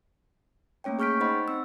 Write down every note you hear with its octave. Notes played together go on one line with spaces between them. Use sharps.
A3 A#3 C#4 C#5 G5
G#4 C#6 F6 G6 B6 D7
D#4 C5 D#5 F#5 B5
C4 E6